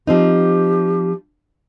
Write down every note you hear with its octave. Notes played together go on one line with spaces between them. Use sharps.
F3 C4 D#4 G4